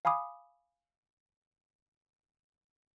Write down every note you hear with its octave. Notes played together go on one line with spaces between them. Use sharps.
F5 G#5 B5 D6 D#6